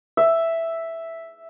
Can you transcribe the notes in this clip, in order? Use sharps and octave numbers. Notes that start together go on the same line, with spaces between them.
E5